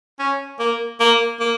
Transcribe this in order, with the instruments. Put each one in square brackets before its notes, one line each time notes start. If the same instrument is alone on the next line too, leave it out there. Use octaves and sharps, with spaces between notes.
[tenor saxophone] C#4
A#3
A#3
A#3